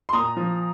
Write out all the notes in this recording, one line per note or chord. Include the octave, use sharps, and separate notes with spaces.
C6
A#2 A#5 D#6
F3